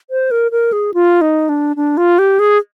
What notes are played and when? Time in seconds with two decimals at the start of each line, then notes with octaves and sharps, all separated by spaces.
0.10 C5
0.31 A#4
0.51 A#4
0.72 G#4
0.94 F4
1.21 D#4
1.49 D4
1.76 D4
1.97 F4
2.19 G4
2.39 G#4